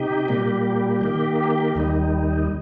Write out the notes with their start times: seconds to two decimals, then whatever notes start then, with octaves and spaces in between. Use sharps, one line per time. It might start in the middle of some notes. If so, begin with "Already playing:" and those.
Already playing: C3 D#4 G4
0.28 A#2 G3 A#3 G4
1.01 D#3 A#3 G4
1.75 D#2 D#3 G3 D#4